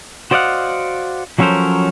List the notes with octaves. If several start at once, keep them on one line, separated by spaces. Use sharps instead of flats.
F#4 C5 D5 D#5 F5 F#5
F3 F#3 C#4 A4 A#4 C5